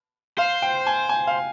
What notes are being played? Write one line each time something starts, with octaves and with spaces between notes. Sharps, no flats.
C5 F5
G5
G#5
G#5
F5